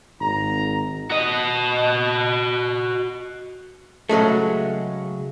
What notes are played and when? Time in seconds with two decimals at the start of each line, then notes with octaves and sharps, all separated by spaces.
0.21 G#1 A#5
1.10 F#4 D#5
4.09 C#3 F#3 G#3 A3